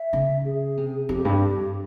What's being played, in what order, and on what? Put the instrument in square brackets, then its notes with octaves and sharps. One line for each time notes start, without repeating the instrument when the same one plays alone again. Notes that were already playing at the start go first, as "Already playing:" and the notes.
Already playing: [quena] E5
[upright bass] C#3
[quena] G#4
[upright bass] C3
[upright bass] F2 [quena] G4
[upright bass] G2